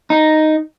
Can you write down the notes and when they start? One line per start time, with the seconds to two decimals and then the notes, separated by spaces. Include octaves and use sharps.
0.10 D#4